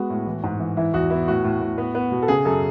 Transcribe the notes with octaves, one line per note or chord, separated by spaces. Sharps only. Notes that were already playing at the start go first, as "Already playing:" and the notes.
Already playing: G#3 B3 F#4
A2
E3
G#2
E3
E3 E4
E2 F#4
B3 E4
A2 F#4
A2
A2
B3
B3
B2
A4
C#3 G#4
F#2 A4